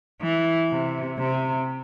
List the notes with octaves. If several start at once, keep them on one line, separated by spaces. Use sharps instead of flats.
E3
C3
C3